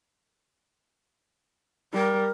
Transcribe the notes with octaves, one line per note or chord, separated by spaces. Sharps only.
G3 A#4